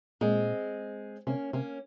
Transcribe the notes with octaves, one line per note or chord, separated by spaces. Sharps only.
A#2 G#3 C4
C3 A#3 C#4
C3 A#3 C#4